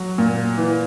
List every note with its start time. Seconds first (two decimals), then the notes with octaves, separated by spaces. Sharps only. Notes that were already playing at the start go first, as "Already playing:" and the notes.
Already playing: F#3
0.18 A#2
0.57 E3